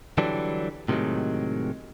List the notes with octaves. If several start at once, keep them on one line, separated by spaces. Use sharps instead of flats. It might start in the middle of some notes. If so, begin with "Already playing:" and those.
D3 E3 F#3 G3 D4
A2 C3 D#3 F3 F#3 G#3